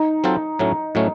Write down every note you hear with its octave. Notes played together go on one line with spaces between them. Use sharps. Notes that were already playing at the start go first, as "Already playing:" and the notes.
Already playing: D#4
F#3 C4 F4 A4 C5
A2 F#3 A3 C#4
A2 F#3 A3 C#4